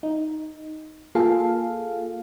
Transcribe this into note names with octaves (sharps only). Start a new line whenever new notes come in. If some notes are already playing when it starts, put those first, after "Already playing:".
D#4
A#3 F4 G#4 A4 F5